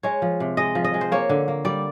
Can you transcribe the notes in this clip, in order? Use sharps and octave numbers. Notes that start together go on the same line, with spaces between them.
G#3 C#5
F3
C3
G#3 D#5
F3
D#5
G#3
C5
A#3 C#5
D3
A#3
G3 D5